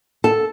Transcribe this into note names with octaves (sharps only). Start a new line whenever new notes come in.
A4